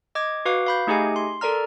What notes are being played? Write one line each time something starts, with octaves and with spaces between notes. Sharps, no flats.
D#5 D6 G#6
F#4 B4 F5 D6
F5 B5 G6
A3 D#4 G4 G#4 D#5 G#5
C6
A4 A#4 D5 A#5 F6